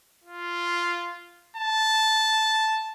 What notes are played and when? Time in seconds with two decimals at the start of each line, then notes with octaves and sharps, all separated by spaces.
0.24 F4
1.56 A5